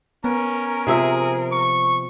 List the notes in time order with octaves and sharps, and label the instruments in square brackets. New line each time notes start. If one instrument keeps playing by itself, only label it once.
[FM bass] B3 [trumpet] C#4 [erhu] A#4
[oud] C3 F3 E5 [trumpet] G#4
[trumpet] C#6